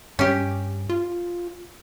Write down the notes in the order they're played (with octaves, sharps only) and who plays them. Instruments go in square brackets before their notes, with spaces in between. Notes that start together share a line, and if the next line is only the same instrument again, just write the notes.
[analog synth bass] G2 [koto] C#4 G4
[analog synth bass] F4